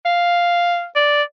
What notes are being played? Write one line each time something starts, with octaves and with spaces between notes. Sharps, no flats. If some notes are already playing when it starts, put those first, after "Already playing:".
F5
D5